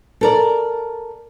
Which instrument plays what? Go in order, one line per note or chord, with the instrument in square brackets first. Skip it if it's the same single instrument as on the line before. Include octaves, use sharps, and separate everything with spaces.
[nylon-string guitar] A4 A#4 D5